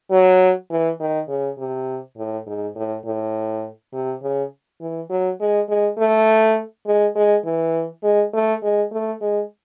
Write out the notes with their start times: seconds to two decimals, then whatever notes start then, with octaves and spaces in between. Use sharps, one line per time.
0.11 F#3
0.71 E3
1.00 D#3
1.29 C#3
1.58 C3
2.17 A2
2.47 G#2
2.76 A2
3.05 A2
3.93 C3
4.23 C#3
4.81 E3
5.10 F#3
5.40 G#3
5.69 G#3
5.98 A3
6.86 G#3
7.16 G#3
7.45 E3
8.04 G#3
8.34 A3
8.63 G#3
8.92 A3
9.21 G#3